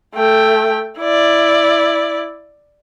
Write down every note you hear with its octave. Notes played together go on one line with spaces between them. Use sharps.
A3 G5
E4 D5